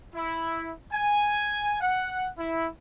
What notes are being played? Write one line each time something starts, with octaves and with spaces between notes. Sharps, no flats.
E4
G#5
F#5
E4